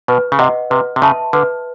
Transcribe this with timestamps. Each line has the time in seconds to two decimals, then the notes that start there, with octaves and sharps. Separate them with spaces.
0.08 B2 B4
0.32 C#3
0.39 C3 D#5 F#5
0.70 C3 B4
0.96 C3
1.02 C#3 E5 A5 C6
1.33 D3 B4